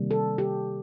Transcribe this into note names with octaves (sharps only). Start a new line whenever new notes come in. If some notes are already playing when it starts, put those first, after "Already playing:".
Already playing: C3 D#3 G3 A#3
A4
G4